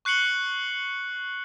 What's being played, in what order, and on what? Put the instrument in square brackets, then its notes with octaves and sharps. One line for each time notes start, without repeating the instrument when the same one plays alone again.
[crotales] C#6 F#6 C7 C#7 F#7 G7